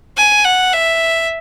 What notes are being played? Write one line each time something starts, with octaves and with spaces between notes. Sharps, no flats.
G#5
F#5
E5